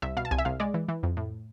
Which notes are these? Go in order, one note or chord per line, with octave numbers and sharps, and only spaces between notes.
C2 E5
B2 F5
A5
C2 G#5
E5
C2 F5
G#3 D5
E3
E3
F2
A2